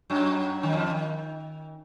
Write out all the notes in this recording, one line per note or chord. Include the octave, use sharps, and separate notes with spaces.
F#2 F#3
D#3
F2 F3
D#3